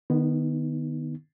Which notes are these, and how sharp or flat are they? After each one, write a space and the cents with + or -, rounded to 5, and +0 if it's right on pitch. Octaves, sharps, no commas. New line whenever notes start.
D#3 -35 B3 -5 D#4 +20